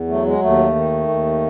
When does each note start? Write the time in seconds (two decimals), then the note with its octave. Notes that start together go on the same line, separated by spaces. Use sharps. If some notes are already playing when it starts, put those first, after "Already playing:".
Already playing: E2
0.08 F#3 A3
0.25 G#3
0.42 D#2 A3
0.75 D#3
1.08 D#2